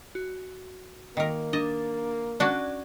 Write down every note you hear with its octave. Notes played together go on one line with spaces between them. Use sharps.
F#4
D#3 A#3 A#4
D4 D#5
C#4 D4 F#4 D5